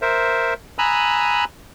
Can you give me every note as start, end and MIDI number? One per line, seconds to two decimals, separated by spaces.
0.02 0.54 70
0.02 0.54 72
0.02 0.54 76
0.79 1.45 80
0.79 1.45 82
0.79 1.45 83
0.79 1.45 87
0.79 1.45 88
0.79 1.45 90